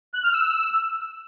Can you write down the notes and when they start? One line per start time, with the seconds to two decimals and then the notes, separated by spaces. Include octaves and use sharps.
0.14 F#6
0.24 F6
0.34 E6